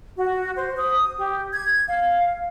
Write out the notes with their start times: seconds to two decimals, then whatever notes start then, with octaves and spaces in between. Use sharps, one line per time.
0.16 F#4
0.56 C5
0.77 D#6
1.19 G4
1.52 G#6
1.88 F5